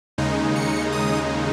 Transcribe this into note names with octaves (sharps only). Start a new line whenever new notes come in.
D#2 C#3 G#3 D#4
C#7
D#6